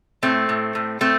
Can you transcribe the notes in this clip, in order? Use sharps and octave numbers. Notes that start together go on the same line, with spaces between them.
A2 A3 C4
A2
A2
A2 A3 C4